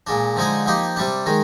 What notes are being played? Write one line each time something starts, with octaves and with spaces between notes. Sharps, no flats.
A#2 G#3 D4
D3 F3 G#3 D#4 G#4
F3 A#3 D#4 G4
C3 G3 D4
D#3 G#3